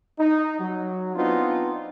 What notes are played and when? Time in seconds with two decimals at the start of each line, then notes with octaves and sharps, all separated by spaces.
0.19 D#4
0.59 F#3
1.15 B3 C4 D4 D#4 F4